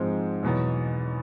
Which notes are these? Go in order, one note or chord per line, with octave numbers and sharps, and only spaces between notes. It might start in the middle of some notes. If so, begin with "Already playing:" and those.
Already playing: G#2 F3 G#3 C4
E2 B2 F#3 B3